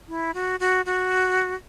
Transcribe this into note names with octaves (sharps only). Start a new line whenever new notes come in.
E4
F#4
F#4
F#4